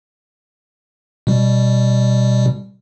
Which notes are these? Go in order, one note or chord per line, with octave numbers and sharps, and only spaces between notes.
B2 G3